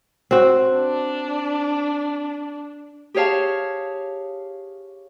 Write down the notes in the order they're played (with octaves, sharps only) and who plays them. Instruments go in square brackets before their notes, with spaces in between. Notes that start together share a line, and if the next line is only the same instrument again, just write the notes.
[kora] C4 F#4
[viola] D4
[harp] G4 G#4 C#5 F5 A5